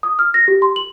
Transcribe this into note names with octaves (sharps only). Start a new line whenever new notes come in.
D#6
F6
A#6
G4
C6
F#7